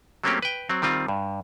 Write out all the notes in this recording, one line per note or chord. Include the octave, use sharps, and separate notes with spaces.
F#3 A3 A#3 C4 C#4 G4
B4 G5
F#3 C4
D#3 G3 C4 F4
G2